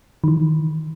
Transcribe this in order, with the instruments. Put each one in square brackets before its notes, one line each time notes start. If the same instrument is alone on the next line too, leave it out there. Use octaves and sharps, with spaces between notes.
[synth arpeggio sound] D#3 E3